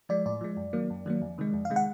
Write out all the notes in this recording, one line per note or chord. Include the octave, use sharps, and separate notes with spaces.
F3 G#3 D5
A2 D5
F3 G#3
F#2
D#3 F#3 A#3
F#2
D#3 F#3 A#3
F2
C3 D#3 G#3
F2
F5
C3 D#3 G#3
F#5